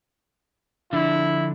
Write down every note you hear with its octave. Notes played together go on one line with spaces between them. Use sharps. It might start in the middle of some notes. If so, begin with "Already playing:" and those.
D3 F3 D4 E4